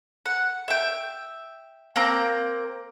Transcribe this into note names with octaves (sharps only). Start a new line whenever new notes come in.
F#5
E5 G5
A#3 C4 A#5